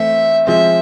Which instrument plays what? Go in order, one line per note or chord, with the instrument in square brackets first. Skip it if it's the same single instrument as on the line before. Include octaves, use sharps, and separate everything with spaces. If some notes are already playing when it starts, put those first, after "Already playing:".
Already playing: [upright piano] E3 A3 C4 [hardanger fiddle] E5
[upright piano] F3 G#3 C4 [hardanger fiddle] E5